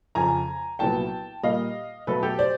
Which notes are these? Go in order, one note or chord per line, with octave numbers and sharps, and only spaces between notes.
F2 C#3 F3 G#5 A#5
C2 A#2 F#3 B3 G5 A5
A#2 G3 A#3 D#5 F5
B2 F#3 A3 A4 B4
G4 A4
C5 D5